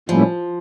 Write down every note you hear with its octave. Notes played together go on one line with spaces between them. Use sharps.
A2 F3 G3 A#3 C#4 E4